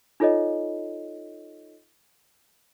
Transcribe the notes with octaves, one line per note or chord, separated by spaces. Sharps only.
D#4 F4 A4 C#5 D#5